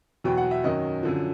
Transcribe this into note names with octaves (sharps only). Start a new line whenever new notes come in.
E2 B2 F#3 G5
F#5
E5
F#2 D#3 F#3 D#5
F#2 D3 F3